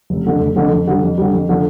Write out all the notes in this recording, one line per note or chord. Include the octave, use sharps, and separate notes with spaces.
F1
F2 D3 A3
F1
F2 D3 A3
F2
D3 G3
F2
D3 G3
F2
D3 F3 A3 D4